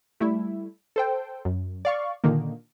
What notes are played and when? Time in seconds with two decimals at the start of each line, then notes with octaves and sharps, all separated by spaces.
0.20 G3 A3 E4
0.96 A4 C5 G5
1.45 F#2
1.85 D5 F5 C#6
2.24 A#2 D3 D#3 A#3